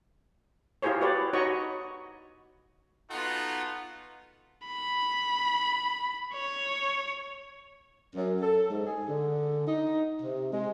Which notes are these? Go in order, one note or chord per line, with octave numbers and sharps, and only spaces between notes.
E4 F4 G4 G#4 C5 C#5
F#4 G4 B4 C#5 D5
D#4 F#4 C#5 D#5 B5 C#6
B3 D#4 F4 F#4 A4 F#5
B5
C#5
F#2
A4
G#2
G#4
D3
D#4
C3
G#3